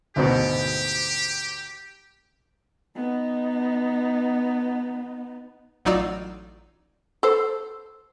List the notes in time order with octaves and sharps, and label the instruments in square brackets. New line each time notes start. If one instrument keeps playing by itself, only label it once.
[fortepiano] D2 G#2 B2 [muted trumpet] G4
[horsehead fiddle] B3 D#4
[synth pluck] A1 F#3 D#4 F4 D5 E6
[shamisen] A4 C5